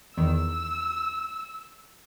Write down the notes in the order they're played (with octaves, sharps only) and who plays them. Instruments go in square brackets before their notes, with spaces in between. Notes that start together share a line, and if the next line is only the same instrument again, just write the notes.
[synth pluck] E2 D#3 [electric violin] E6